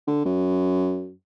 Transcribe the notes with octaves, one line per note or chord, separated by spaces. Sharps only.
D3
F#2